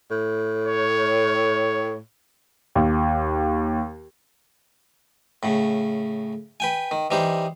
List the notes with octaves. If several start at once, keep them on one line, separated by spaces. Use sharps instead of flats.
A2
C#5
D#2
A2 C#3
B4 G5 G#5
D#3
E3 G3 D#4 C5